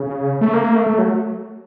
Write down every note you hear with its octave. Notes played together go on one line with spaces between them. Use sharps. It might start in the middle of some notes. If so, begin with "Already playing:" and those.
Already playing: C#3
A3
A#3
A#3
A3
A3
F#3